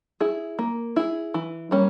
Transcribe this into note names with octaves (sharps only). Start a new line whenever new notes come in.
E4 G#4
A#3
E4 G#4
E3
G3 A#3 C#4